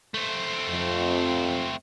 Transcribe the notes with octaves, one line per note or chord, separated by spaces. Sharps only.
A3 C4
F2